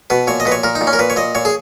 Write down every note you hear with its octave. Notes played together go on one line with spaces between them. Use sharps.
B2 B4
A#2 C#5
D#5
A#2 B4
C#5
A#2 A#4
D#4
A#2
C#4
A#4
A#2 B4
C#5
A#2 D#5
A#2 C#5
G#4